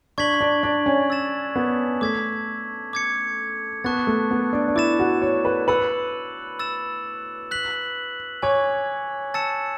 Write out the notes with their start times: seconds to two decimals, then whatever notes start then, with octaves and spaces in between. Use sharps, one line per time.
0.18 D4 C#6 G#6 B6 F#7
0.41 D4
0.63 D4
0.86 C#4
1.10 E6 A6 E7
1.56 B3
2.01 A3 D6 G#6 B6
2.93 D6 G#6 C#7
3.84 B3 A5 C#6 F#6 A6
4.07 A3
4.31 B3
4.53 D4
4.68 D4
4.76 E4 D6 A6 E7
4.99 F#4
5.22 C#5
5.45 B4
5.68 B4 E6 A6 C#7 F#7
6.59 E6 A6 E7
7.51 F#6 B6 F#7
8.42 C#5 G#5 D6 G#6
9.34 A5 E6 A6 C#7 E7